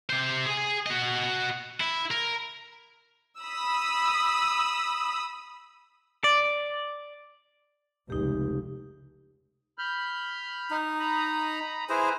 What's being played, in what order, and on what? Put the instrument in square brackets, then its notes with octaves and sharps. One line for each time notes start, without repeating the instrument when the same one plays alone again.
[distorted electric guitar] C3 C5
G#4 G#5
F#4 D#5
E4
A#4
[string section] B5 D#6 E6
[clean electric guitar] D5
[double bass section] F1 C#2 [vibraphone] D#4 G4
[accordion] B5 F6 G6
[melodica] D#4
[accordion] A#5 B5 D#6
[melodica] E4 G#4 C5 [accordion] B4 G#5 A#5